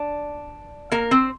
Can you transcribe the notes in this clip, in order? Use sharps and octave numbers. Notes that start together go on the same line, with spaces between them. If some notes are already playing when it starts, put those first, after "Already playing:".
Already playing: D4 D5
A#3 A#4
C4 C5